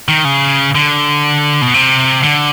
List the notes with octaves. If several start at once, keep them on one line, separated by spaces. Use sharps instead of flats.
D#3
C#3
D3
B2
C3
D3